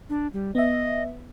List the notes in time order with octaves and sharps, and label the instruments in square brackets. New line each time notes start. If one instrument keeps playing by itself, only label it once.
[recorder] D4
G3
[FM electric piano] B3 E5 [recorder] D#5